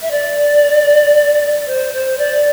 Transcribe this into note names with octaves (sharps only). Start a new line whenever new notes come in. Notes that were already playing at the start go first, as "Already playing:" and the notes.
E5
D5
C5
C5
D5